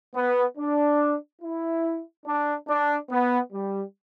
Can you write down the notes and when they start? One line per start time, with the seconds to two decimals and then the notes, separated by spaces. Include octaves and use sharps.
0.15 B3
0.58 D4
1.42 E4
2.26 D4
2.68 D4
3.10 B3
3.53 G3